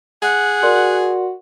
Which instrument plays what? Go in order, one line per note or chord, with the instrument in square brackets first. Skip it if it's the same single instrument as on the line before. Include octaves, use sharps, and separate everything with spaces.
[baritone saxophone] G#4 [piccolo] F#5
[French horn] F#4 [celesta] A#4 D5 C6